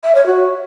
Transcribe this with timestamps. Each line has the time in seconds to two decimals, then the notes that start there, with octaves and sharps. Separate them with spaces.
0.03 E5
0.14 C#5
0.26 F#4